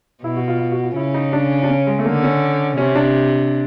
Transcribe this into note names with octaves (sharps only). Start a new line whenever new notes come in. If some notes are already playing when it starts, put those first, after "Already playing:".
B2 E4
F#4
F4
F4
F#4
F4
C#3 E4
D#4
D4
D4
C#4
G#3
A3
D3 A#3
C#4
C3 C#4
D4